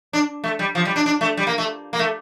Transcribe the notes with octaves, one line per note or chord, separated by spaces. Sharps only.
D4
A3
G3
F3
G3
D4
D4
A3
G3
A#3
A3
A#3
A3